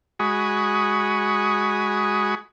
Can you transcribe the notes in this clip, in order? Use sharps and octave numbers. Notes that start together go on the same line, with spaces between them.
G#3 F#4 G#5 B5 C#6 D#6